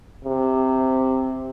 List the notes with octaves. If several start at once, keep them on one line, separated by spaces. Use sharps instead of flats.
C3